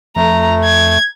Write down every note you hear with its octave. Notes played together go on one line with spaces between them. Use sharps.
F2 A3 A#5
G#6